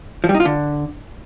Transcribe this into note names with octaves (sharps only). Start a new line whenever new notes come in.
F3
G3
D#4
F4
D3